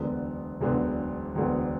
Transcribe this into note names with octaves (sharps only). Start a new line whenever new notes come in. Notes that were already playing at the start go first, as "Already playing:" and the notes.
Already playing: E1 D2 D3 F#3 B3
E1 D2 D3 F#3 B3
E1 D2 D3 F#3 B3